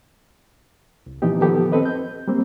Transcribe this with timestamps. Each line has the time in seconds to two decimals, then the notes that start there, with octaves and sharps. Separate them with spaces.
1.06 C2
1.22 A#2 E3 F3 B3 D#4 G4
1.41 D#3 F3 B3 G4 A4
1.72 C4 A4 B4 D#5
1.85 G6
2.28 G3 A#3 C4